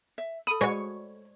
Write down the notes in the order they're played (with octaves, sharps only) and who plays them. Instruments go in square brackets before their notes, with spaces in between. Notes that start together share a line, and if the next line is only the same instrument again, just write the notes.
[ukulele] E5
[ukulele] A4 B5 [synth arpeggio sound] D#6
[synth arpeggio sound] G#3 F#4 [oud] C#5